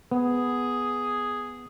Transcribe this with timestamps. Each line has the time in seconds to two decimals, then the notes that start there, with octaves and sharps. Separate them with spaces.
0.11 B3 G#4